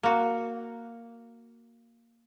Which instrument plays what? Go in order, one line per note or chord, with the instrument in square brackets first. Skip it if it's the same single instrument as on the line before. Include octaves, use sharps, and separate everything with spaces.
[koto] A#3 F#4